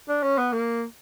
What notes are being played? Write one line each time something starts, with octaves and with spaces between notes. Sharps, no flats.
D4
C#4
B3
A#3